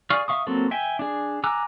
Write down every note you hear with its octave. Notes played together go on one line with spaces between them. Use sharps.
G#4 D5 F5 C#6 F6
E5 F5 C#6 D#6
F#3 A#3 C4 A4
E5 G5 G#5
D4 G#4
G#5 A#5 D6 E6 F#6